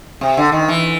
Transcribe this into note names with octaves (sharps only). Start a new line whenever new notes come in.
C3
D3
D#3
E3